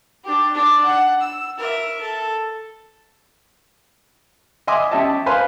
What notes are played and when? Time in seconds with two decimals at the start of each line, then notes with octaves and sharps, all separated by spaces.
0.24 D4 G4
0.53 D4 D5
0.84 F#5
1.21 E6
1.58 A#4 E5
2.01 A4
4.67 D#5 E5 G#5 C6 D6 D#6
4.91 C#4 G4 D#5 E5 A5
5.26 B4 C5 F5 G#5 B5 C6